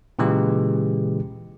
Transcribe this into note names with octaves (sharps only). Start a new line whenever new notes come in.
A#2 C#3 E3 G#3 G4